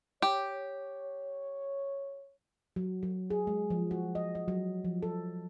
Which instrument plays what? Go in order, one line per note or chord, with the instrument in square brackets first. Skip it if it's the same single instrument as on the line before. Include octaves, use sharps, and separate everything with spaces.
[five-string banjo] G4 [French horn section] C#5
[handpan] F#3
F#3
G#4
G#3
F3
F#4
D#5
D#5
F#3
F3
A4